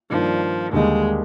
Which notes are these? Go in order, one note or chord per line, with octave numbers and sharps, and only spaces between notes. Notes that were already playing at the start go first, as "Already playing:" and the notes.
G2 D#3 F3 A#3 D4
D#2 D3 G3 G#3 A#3 D#4